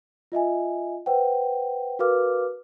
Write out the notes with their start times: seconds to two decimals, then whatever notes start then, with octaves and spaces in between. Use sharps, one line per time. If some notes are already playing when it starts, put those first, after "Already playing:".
0.32 F4 D#5 E5 G#5
1.06 B4 C5 F#5 G5
1.99 F#4 A#4 B4 F5 D6 F6